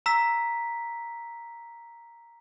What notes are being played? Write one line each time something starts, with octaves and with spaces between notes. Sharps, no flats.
A#5 E6 B6